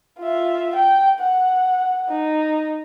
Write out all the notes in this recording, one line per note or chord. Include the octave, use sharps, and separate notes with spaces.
F4 E5
G5
F#5
D#4